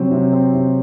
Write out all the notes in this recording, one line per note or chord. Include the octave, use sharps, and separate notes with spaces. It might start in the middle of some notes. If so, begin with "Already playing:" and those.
Already playing: C3 F#3 C4
C3
C4
C3